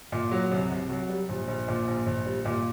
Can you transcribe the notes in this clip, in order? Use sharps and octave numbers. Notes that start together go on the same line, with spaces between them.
A#2
F#3
C2
C2
F#3
G3
A#1
A#1
A#2
A#1
A#1
G3
A#2